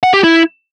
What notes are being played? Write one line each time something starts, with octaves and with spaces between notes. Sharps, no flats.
F#5
G4
E4